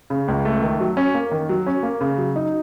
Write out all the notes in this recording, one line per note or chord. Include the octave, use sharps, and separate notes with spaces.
C#3
C#2
A3
D#3
F#3
C#4
A#3
D#3
F#3
C#4
A#3
C#3
F#3
D#4